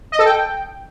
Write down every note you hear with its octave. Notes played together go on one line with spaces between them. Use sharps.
D#5
A4
G5